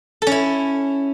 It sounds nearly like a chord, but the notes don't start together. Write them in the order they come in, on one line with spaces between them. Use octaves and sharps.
A4 C#4 E4